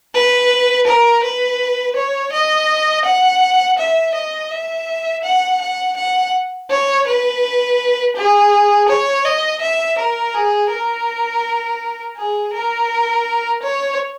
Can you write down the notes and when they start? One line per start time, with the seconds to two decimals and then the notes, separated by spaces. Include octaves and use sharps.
0.15 B4
0.87 A#4
1.23 B4
1.96 C#5
2.33 D#5
3.05 F#5
3.78 E5
4.15 D#5
4.51 E5
5.24 F#5
5.61 F#5
5.97 F#5
6.70 C#5
7.07 B4
8.17 G#4
8.89 C#5
9.25 D#5
9.61 E5
9.98 A#4
10.35 G#4
10.71 A#4
12.17 G#4
12.53 A#4
13.63 C#5